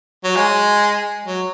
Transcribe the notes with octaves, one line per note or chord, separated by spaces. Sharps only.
F#3
G#3
F#3